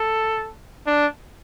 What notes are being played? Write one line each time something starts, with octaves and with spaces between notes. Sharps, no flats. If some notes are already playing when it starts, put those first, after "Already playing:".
Already playing: A4
D4